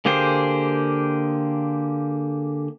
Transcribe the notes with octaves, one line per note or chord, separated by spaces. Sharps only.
D3 A#3 G4 G#4 C5